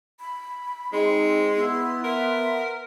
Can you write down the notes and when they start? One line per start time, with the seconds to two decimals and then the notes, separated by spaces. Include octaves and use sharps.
0.20 B5
0.93 G#3 C4 D#4 C6
1.56 B3 E4
2.04 A#4 E5